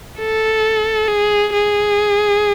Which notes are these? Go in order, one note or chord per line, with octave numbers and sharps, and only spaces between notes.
A4
G#4
G#4